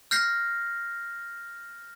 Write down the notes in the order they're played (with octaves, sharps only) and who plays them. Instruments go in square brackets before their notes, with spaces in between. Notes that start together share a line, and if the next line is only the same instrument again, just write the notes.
[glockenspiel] F6 G6 A#6 C7